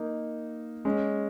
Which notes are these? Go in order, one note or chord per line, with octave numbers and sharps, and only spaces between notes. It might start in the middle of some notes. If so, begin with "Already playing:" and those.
Already playing: A#3 D#4
G#3 C#4